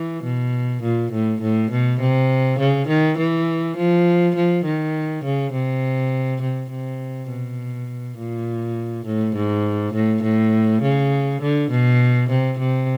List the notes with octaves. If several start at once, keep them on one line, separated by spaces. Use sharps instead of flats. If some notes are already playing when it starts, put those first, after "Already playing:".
Already playing: E3
B2
A#2
A2
A2
B2
C3
C#3
D#3
E3
F3
F3
D#3
C#3
C3
C3
C3
B2
A#2
A2
G#2
A2
A2
C#3
D3
B2
C3
C3